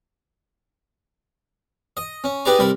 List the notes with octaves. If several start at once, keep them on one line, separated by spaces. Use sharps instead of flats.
D#5
C#4
D#4 G4 G#4 B4 D5 A#5
C2 G3 A#4 B5